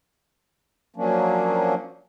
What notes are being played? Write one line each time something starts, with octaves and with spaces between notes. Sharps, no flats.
F3 F#3 A#3 C#4 D4